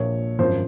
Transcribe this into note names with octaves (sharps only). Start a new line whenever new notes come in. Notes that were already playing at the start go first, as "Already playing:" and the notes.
Already playing: A#1 A#2 F3 C#5
G#1 F#2 F3 C5